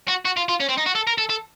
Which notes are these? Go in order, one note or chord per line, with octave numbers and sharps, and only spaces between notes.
F#4
F#4
F4
F4
C#4
C4
D#4
F#4
A4
A#4
A4
A4